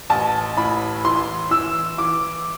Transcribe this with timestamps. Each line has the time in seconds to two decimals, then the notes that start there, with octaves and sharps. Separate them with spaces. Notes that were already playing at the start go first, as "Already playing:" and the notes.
0.10 A1 A5
0.57 A2 B5
1.04 E3 C6
1.51 E3 E6
1.98 E3 D6